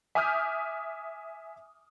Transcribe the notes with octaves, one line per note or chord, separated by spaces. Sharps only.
E5 G#5 D6 D#6 F6 G6